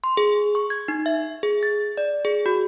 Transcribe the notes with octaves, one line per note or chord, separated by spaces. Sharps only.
C6
G#4
C#6
G#6
D#4
E5
G#4
A6
D5
G#4
F#4